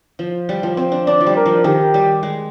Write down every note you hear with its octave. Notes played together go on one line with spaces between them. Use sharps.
F3
G3
F3
C4
D4
D4 D5
F3
G3
A#4
F3
D#3 G4
G3
G#3